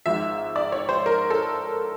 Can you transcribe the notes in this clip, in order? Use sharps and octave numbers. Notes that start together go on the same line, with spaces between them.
G#1 G#2 F3 E5
D5
C#5
C5
A#4
A4